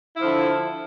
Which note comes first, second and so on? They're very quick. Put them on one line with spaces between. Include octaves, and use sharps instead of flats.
E4 F3 D3